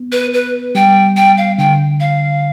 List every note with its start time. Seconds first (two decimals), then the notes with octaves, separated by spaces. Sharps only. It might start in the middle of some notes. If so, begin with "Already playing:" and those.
Already playing: B3
0.12 B4
0.34 B4
0.75 G3 G5
1.17 G5
1.37 F5
1.58 D3 G5
2.00 F5